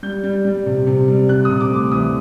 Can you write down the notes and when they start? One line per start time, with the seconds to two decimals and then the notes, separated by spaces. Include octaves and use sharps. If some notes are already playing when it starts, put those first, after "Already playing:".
0.03 G3 G6
0.24 G3
0.45 G3
0.66 C3
0.87 C3
1.08 G3
1.29 C3 F#6
1.45 C3 D#6
1.61 D6
1.70 D2
1.76 D6
1.92 E3 D#6